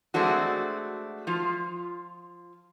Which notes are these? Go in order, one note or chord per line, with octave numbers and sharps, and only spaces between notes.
G#3 A3 C4 D4 F#4
F3 F4